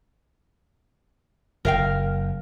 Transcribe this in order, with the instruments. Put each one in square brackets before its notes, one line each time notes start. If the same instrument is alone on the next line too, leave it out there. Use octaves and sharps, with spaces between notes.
[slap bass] F#1 [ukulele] A#4 F5 G5